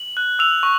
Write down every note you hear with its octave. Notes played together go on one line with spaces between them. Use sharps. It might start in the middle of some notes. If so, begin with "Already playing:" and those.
Already playing: F#7
F#6
E6 F7
C#6